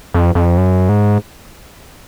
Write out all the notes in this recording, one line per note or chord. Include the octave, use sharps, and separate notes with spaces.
F2
F2
F#2
G#2